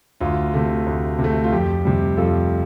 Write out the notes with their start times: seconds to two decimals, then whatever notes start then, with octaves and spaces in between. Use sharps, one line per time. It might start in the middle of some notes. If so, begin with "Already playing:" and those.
0.20 D2 F4
0.54 C3 A3
0.86 D2
1.19 C3
1.24 A3
1.44 F4
1.52 F2 G4
1.85 C3 G3
2.17 F2 F4 A4